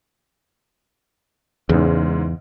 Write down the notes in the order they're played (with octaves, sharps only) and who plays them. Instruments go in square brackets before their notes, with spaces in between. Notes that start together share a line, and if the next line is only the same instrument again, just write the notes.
[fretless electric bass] E2 [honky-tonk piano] G#2 C#3